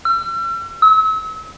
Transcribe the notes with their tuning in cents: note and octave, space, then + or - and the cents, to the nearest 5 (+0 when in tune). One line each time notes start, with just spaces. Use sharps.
E6 +45
E6 -35